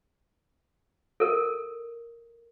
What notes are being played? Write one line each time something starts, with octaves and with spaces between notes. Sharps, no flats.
A4 A#4